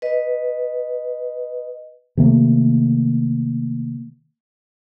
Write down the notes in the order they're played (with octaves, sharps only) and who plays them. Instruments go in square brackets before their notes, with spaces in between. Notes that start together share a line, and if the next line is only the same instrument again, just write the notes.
[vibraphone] B4 D#5
[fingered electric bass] C3 D#3 A3 A#3